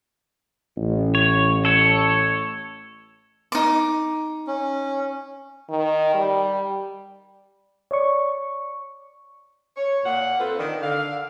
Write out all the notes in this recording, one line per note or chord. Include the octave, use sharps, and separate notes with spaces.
A1
C#5
A4 C#5
D#4 D6
C#4
D#3
G3
C#5 D5 C#6
C#5
A#2 F#5
C4 F4 A4 B4 C5
D#3 D4
D3 F5